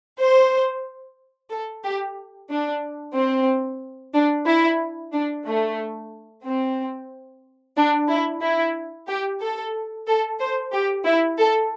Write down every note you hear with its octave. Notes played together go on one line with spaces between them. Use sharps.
C5
A4
G4
D4
C4
D4
E4
D4
A3
C4
D4
E4
E4
G4
A4
A4
C5
G4
E4
A4